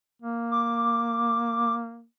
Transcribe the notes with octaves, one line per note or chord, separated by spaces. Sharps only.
A#3
D6